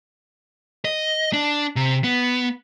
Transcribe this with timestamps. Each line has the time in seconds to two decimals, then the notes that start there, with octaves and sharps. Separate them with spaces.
0.85 D#5
1.33 D4
1.76 C3
2.04 B3